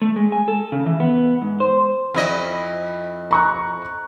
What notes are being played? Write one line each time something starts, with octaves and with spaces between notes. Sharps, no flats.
A3
G#3
G#5
A4
C#3
E3
B3
G#2
C5
F2 E4 D#5
A#5 C#6 F#6